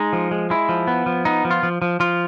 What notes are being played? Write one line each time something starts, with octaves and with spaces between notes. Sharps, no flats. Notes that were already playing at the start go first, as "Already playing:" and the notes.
Already playing: G#3 D#4
F3
G#3
G#3 E4
F3
B3
F3
B3 D#4
F3
F4
F3
F3
F3 F4